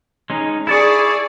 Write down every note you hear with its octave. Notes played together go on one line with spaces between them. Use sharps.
G#3 C#4 D#4
E4 G#4 D5 A5 C#6